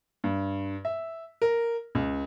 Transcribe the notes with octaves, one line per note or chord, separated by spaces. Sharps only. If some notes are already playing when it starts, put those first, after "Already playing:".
G2
E5
A#4
C#2